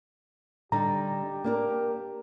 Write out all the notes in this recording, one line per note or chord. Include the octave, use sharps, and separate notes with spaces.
D3 G3 D#4 G4 A#5
A#3 D4 A#4